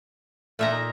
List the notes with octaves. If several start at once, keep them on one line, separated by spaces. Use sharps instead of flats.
A#2 A3 E5 A#5
D#4